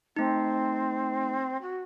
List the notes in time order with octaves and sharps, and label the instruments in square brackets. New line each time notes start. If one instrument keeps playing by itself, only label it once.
[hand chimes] A3 D#4 [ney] C4
[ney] F#4